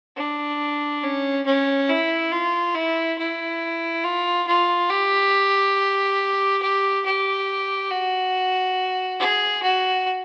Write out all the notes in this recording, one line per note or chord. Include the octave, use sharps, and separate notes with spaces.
D4
C#4
C#4
E4
F4
E4
E4
F4
F4
G4
G4
G4
F#4
G#4
F#4